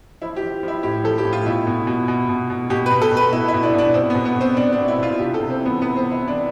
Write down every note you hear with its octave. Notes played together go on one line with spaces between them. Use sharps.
F3 E4
G4
F3
F3 E4
A2 G4
F3 A4
G4
A2
F4
B2 E4
B2
B2
B2
B2
B2
B2 G4
B4
B2
A4
B2
B4
B2 E4
E4
B2
D4
B2 D4
B2 C4
B3
B2
B3
B2
C4
B2 D4
D4
B2
E4
B2 F4
C3 G4
A4
C3
C4
E3
B3
C3 B3
C4
C3
E4
E3
D4